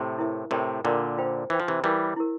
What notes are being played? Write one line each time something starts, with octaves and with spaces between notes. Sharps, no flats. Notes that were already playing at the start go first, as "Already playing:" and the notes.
Already playing: A2 C3
E4 A#4 E5
A2 C3 A#4 D5 G5
A#2 D3 A#4 D5 G5
F4 C5 G5
E3 F4 C5 G5
F3
C3 E3
E3 G3 E4 G4 A#4
E4 G4 A#4